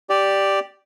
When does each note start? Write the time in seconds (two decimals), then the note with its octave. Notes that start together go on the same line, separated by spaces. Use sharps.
0.10 G4 D5